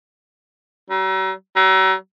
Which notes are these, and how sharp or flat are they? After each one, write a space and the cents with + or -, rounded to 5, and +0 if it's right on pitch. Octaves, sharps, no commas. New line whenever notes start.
F#3 +45
F#3 +40